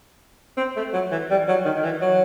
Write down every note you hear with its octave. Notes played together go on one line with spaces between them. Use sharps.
C4
A3
F#3
E3
G3
F#3
D#3
D#3
E3
F#3